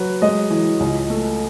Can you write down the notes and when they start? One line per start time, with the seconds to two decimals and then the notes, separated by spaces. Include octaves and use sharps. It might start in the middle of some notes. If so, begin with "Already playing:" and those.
Already playing: F#3 B4
0.22 G#3 D#5
0.50 E3
0.80 C#2
1.10 A3